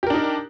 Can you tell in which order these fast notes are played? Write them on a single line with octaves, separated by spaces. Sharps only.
G4 A#4 D4 D#4